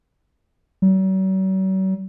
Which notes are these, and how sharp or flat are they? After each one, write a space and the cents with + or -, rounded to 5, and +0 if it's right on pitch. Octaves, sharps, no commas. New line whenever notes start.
F#3 +45